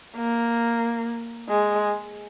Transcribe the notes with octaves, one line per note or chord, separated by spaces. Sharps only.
A#3
G#3